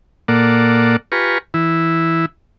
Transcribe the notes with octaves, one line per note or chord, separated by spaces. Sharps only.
A#2 A#3 A4 D5 F#5
F4 G4 B4 G#5 A#5 C#6
E3 E4